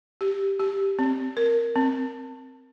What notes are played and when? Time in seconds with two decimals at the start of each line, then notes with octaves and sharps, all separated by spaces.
0.21 G4
0.60 G4
0.99 C4
1.37 A#4
1.76 C4